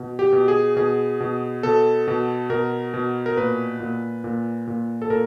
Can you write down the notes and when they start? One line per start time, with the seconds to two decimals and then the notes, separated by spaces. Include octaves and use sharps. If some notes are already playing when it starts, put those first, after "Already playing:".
Already playing: B2
0.19 G4
0.33 B2
0.48 G#4
0.76 B2 G#4
1.20 B2
1.63 B2 A4
2.07 B2
2.50 B2 A#4
2.94 B2
3.26 A#4
3.37 A#2 B4
3.80 A#2
4.24 A#2
4.67 A#2
5.02 A4
5.10 A#2 A#4